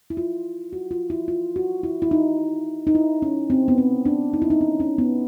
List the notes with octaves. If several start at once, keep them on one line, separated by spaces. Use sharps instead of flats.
E4
F4
F#4
F4
E4
F4
F#4
E4
E4
D#4
D#4
E4
C#4
C4
B3
C4
D4
D#4
E4
D#4
C#4
C#4
B3